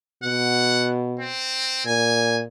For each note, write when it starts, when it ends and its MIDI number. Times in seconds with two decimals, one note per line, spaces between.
0.23 1.30 47
0.23 0.91 78
1.20 1.82 60
1.86 2.44 46
1.86 2.39 80